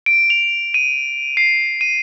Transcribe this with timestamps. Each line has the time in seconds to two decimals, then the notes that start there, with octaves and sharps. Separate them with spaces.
0.06 D7
0.30 F7
0.74 D#7
1.37 C7
1.81 D#7